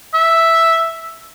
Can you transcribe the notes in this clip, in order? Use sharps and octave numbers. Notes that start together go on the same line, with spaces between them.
E5